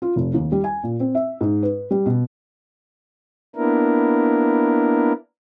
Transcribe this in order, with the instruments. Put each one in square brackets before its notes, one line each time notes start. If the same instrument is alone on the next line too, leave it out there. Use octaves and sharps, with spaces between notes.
[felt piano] F4
F1
D#2
G3
G#5
A#2
C4
E5
G#2
B4
G3
B2
[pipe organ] A#3 B3 D4 E4 A#4